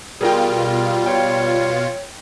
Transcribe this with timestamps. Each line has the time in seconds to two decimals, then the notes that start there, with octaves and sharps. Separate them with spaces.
0.21 B2 G3 F4 G#4 A#4 G5
1.06 C#5 G5